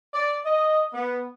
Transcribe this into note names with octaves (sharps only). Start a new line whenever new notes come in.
D5
D#5
B3